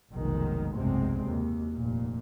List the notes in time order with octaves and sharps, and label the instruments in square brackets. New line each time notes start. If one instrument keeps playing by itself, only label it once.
[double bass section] F1 B1 D#3 G#3
F1 B1 G2 C3 G#3 C4
F#1 D#2
F1 A#2